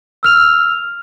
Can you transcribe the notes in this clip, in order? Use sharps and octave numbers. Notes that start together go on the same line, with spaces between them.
E6 F6 F7